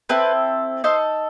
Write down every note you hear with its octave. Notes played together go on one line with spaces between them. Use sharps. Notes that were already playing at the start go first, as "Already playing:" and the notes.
C4 E4 A4 B4
D#4 A4 C5